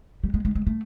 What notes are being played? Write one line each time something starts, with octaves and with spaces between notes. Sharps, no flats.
G3
G#3
G#3
G#3
A3